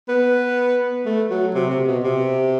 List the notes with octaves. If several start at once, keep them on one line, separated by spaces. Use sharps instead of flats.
B3
A3
F#3
C3
C3
B2
C3